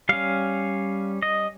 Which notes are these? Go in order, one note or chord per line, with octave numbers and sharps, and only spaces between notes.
G3 C#4 F5
D#5